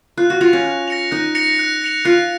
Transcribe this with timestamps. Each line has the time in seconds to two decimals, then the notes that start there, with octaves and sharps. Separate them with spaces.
0.17 F4 F#6
0.30 F#4
0.41 F4 A#6 C#7 F7
0.53 C#4
0.65 F#6
0.88 A#6 C#7 F7
1.11 D#4 F#6
1.35 A#6 C#7 F7
1.59 F#6
1.82 A#6 C#7 F7
2.05 F4 F#6